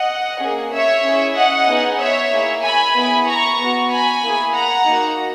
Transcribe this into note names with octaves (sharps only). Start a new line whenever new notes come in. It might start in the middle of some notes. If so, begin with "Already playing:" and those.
Already playing: D#5 F#5
A#3 C#4 G#4
C#5 E5
C#4 E4 G#4
D#5 F#5
B3 D#4 G#4
C#5 E5
A#3 E4 G#4
G#5 B5
B3 E4 G#4
A#5 C#6
B3 F#4
G#5 B5
A#3 E4 G#4
F#5 A#5
A#3 D#4 F#4